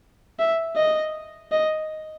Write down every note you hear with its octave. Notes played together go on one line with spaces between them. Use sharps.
E5
D#5
D#5